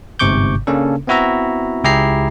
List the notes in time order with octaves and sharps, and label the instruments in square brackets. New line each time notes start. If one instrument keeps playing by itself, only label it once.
[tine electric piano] G1 G#2 C3 C#6 D6 G6
C#3 A#3 C#4 D4 A4
B3 C4 E4 F#4 E5 A#5
C#2 E4 G4 G#4 A#5 C7